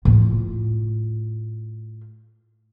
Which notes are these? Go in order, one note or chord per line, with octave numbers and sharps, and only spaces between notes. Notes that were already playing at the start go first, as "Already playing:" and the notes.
A2 F4